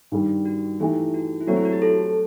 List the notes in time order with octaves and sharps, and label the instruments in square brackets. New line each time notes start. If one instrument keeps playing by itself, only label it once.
[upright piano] G2 D#3 G3
[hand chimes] F#4
[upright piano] E3 A3 D#4 G4 [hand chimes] E4
[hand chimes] F#4
E4
[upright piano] F#3 A3 C4 [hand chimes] F#4
[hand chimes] E4
F#4
G4
A4